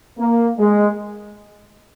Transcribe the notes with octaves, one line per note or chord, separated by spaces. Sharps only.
A#3
G#3